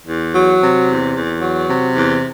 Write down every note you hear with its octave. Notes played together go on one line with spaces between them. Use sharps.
E2
F#3
C3
E2
E2
F#3
C3
E2